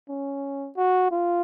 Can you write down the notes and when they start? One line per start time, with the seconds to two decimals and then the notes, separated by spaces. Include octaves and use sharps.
0.09 C#4
0.76 F#4
1.11 F4